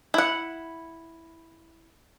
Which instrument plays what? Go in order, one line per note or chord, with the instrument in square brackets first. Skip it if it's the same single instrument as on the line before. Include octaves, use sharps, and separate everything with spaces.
[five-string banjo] E4 F#5